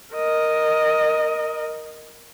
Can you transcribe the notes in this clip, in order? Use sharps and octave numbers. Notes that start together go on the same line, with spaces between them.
A#4 D#5